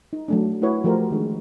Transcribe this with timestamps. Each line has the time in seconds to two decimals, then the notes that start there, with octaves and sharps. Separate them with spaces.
0.13 D#4
0.28 F#3 A3 D4
0.61 A3 E4 F#4 B4 C#5
0.84 F3 A3 F#4 G4 A#4 C5
1.11 D#3 F3 G#3 D4